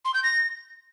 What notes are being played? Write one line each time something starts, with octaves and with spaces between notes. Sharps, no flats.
C6
G6
A#6